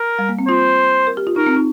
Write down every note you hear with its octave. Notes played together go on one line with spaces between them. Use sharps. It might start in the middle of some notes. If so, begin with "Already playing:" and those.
Already playing: A#4
G3
A#3
C4
F4 C5
A#4
G4
F4
D#4 A#4
C4
D#4